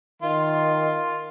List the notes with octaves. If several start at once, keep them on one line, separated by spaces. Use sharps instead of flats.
D#3 F4 C6